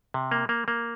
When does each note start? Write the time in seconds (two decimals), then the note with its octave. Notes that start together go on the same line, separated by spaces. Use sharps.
0.14 C3
0.31 A#3
0.49 A#3
0.68 A#3